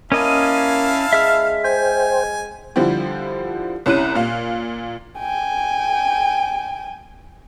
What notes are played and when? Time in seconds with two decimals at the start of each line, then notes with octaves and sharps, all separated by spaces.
0.12 A#3 C#4 E4 D#5 F5 G#5 A5
1.13 G#3 E5 F6
1.64 C5 G5 G#5
2.76 D3 F3 G3 E4 G4
3.86 C2 C#4 E4 F#6 D#7
4.15 A#2 F5
5.19 G5 G#5